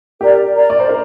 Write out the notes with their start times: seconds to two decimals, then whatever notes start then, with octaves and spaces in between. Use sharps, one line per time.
0.21 G4 A#4 D5 A#5
0.54 A#4 D5 A#5
0.70 D5
0.80 C5
0.89 A#4